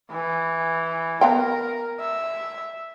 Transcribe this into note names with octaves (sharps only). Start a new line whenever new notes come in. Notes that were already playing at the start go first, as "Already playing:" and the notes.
E3
B3 A#4 F5 G5
E5